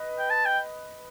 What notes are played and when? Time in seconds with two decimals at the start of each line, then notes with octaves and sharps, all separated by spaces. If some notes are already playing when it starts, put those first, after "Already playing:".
Already playing: B4 D#5
0.19 G5
0.30 A5
0.45 G5